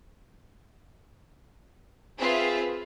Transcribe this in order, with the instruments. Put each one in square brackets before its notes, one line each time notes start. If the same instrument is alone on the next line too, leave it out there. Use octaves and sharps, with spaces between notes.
[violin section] C4 F4 G#4 B4 E5